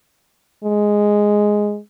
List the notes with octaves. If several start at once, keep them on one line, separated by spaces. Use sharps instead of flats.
G#3